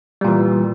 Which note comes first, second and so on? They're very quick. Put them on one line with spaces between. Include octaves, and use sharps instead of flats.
G3 A#2 E3